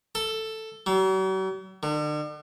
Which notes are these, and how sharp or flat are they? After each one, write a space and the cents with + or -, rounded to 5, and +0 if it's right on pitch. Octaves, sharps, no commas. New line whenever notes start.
A4 +5
F#3 +45
D3 +40